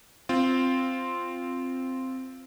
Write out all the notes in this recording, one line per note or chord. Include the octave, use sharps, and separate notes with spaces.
C4 F4